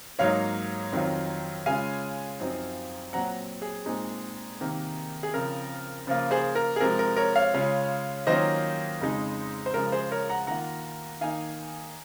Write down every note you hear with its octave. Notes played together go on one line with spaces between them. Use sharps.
G#2 F#3 A#3 D#4 C#5 F5
F2 D#3 F#3 C4 F4
C#3 G#3 C#4 F4 F5 G#5
F#2 F3 C4 D#4
A#2 F#3 C4 F#5 A#5
G#4
A#2 G#3 C4 D#4
C3 D#3 A#3
G#4
C#3 F3 C4 A#4
C#3 F3 A#3 F4
G#4 C5
A#4
G#4
C3 F3 G#3 A#4
A#4
A#4 C#5
C#5 F5
C#3 G#3 C#4 F4
D#3 F#3 A#3 C#4 F4 C5 D#5
F2 C#3 G#3 D#4
C5
C#3 F3 G#3 A#4
G#4 C5
A#4 C#5
F#5 A#5
D#3 A#3 F4 F#5 A#5
D#3 A#3 D#4 F5 G#5